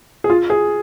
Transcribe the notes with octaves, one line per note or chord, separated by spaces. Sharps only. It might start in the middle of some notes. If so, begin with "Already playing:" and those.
G#4
F4
G#4